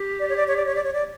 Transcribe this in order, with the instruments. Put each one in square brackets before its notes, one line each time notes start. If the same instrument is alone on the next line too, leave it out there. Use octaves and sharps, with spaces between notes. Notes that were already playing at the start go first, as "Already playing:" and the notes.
Already playing: [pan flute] G4
[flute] D5
C#5
D5
C#5
D5
C#5
D5
C#5
D5